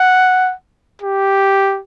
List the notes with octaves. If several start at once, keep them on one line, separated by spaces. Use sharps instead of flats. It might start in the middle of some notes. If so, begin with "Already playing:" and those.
Already playing: F#5
G4